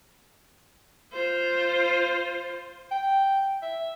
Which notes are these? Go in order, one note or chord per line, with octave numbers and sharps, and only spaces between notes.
F4 C5
G5
E5